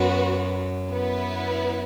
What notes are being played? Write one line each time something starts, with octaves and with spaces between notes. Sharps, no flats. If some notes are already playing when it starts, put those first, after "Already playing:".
Already playing: F#2 B3 F#4 B4
B3 E4 B4